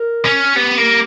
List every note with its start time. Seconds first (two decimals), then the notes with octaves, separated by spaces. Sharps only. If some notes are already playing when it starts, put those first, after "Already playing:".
Already playing: A#4
0.25 C#4
0.56 B3 G4
0.78 A#3